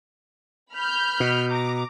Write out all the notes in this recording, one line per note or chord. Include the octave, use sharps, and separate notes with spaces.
B5 F6 G6
B2
A#5 D6